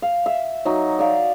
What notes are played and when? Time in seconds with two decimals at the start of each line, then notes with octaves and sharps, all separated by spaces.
0.02 F5
0.26 E5
0.65 F#3 D#4
0.99 D5 F5